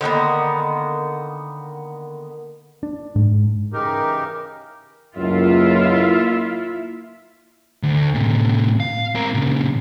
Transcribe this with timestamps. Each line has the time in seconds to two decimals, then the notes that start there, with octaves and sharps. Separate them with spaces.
0.01 D3 D#3 A#3 B3
2.83 D4
3.16 G#2
3.73 C#3 E3 D#4 G4 A#4
5.17 C#2 F#2 A#3 E4 F4 E5
7.83 D2
8.15 A2 C3
8.80 F5
9.15 C4 A#4
9.34 A#2 C#3